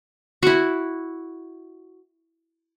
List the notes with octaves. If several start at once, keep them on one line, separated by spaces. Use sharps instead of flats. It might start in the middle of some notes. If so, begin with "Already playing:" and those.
E4 F#4